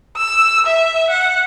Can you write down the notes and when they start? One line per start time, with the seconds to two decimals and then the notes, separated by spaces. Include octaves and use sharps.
0.17 E6
0.66 E5
1.10 F#5